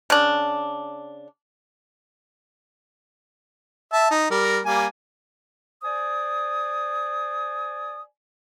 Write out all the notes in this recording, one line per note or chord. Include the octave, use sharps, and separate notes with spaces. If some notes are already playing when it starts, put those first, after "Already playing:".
C#3 D4
E5 A5
D#4
G3 A#4
G3 A#3 G#5
C5 D5 G#5 D#6